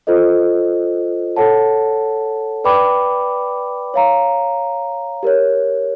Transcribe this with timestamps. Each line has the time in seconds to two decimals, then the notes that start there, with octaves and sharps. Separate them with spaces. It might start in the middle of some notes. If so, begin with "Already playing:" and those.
0.07 F4 A4 C5 D#5
1.36 A4 C#5 F#5 A5
2.64 B4 D5 G5 B5 D6
3.94 C#5 F5 A#5
5.23 G4 A#4 C#5